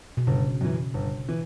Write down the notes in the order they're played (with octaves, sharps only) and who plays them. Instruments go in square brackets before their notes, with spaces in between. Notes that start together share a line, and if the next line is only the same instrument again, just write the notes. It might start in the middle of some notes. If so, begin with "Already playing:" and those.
[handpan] B2
[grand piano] G1 [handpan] C#3
[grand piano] F#2 E3
G1
E3